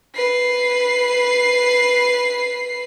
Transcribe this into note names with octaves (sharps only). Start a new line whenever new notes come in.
B4 C7